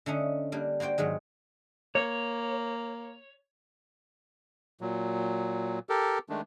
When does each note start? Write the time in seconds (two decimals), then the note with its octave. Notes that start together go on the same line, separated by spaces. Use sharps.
0.06 D3 A3 C#4 D#4
0.52 G3 A#3 D4
0.80 A#3 F#4 C5 D5 G5
0.98 G#2 D#3 F#3 G#3
1.95 A#3 C#5
4.81 A#2 F#3
5.89 G4 A4 A#4
6.29 D#3 G#3 A3 D4